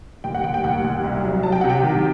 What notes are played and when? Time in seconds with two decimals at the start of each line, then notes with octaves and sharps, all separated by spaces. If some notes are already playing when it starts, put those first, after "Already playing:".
0.24 D#2 G5
0.35 F#5
0.44 D#2 G5
0.54 G5
0.64 D#2 F#5
0.84 D#2
1.04 C2
1.24 F#3
1.43 F#3 A5
1.52 G5
1.61 C3 F#5
1.70 G5
1.83 D#3